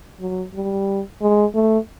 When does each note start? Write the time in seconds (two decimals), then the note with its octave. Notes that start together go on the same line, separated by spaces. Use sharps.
0.20 F#3
0.54 G3
1.21 G#3
1.55 A3